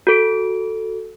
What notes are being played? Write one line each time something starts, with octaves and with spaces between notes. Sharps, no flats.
F#4 A4 D7